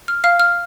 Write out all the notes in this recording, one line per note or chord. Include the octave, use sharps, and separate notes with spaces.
F6
F5 F6
F6